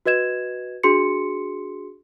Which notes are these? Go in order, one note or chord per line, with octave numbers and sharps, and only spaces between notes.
F#4 B4 D#5 G#6 E7
D4 F#4 G#4 C6 C#7